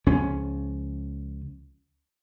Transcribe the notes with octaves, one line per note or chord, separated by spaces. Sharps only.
C#2 F3 C#4